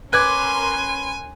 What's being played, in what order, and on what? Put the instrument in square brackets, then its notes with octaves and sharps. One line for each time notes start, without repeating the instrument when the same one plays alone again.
[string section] C#4 A#4 C6 [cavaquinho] B4 D6 [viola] G#5 [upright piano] F#6 G#6